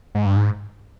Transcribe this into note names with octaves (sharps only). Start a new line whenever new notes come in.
G#2
G2
G#2